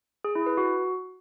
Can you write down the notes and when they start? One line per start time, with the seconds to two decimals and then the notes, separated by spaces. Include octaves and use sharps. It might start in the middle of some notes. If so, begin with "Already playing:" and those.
0.24 G#4
0.35 E4
0.46 B4
0.57 F#4